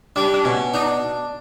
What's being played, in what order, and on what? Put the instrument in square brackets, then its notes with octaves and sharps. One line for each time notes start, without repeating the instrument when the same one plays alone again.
[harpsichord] G3 [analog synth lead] D4
[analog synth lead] D4
[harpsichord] B2 [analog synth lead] C#4
[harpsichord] D4 [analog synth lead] D#4